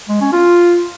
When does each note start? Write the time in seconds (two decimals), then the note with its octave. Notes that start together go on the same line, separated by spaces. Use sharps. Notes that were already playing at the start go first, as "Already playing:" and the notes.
0.09 G#3
0.21 C#4
0.33 F4